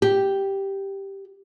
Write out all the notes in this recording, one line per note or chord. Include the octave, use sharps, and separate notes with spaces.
G4